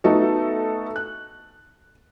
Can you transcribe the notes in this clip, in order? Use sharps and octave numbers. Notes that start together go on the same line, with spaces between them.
A3 B3 D#4 F#4 A4
F#6